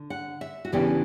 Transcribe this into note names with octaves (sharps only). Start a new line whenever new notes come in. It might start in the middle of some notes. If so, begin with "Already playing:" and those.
Already playing: D3
F#5
E5
F#4
E2 C#3 E3 B3 D4 G4